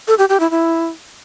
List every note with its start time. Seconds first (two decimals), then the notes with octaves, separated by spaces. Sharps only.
0.08 A4
0.18 G4
0.29 G4
0.40 E4
0.51 E4